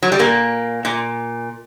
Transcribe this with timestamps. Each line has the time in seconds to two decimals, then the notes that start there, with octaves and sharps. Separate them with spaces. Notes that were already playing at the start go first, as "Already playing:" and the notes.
0.02 F#3
0.12 G3
0.19 A#2 A#3
0.85 A#2